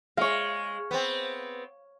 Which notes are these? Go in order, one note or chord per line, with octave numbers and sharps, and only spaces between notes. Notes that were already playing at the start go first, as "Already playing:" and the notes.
G#3 C#5 F5
B3 C4